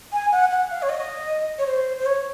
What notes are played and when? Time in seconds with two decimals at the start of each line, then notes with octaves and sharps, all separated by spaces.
0.13 G#5
0.32 F#5
0.51 F#5
0.71 F5
0.82 C#5
0.89 D#5
1.59 C#5
1.67 C5
1.99 C5
2.06 C#5